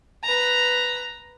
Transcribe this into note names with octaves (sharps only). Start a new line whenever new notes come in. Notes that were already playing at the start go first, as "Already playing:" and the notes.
B4 A#5